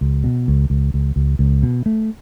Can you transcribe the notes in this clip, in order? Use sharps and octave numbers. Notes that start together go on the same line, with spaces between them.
C#2
B2
C#2
C#2
C#2
C#2
C#2
B2
A3